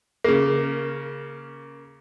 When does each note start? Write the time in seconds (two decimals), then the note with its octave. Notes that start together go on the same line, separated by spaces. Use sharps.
0.24 C#3 A#3